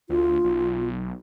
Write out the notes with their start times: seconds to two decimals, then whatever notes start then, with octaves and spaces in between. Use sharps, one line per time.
0.09 D2 F4
0.44 B1